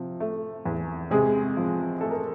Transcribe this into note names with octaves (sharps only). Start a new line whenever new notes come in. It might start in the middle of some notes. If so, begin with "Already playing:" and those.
Already playing: C3 F3
A3
E2
C3 G#3 G#4
F3
A3 A4
A#4